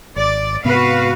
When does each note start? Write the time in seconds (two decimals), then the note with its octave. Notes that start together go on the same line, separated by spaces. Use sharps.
0.16 G#1 D5
0.65 G#2 C3 B3 F#4 B4 F5